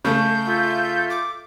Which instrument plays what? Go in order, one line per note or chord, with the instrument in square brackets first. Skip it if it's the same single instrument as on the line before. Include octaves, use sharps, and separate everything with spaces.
[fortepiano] C#3 A3 [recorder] G6
[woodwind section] F4 A4 E5
[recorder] D6